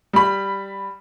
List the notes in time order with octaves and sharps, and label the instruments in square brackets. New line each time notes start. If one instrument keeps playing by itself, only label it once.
[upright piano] G3 B5